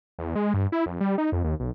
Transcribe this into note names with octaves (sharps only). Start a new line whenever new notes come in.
E2
G#3
G2
E4
F2
G3
D#4
F2
D#2
B1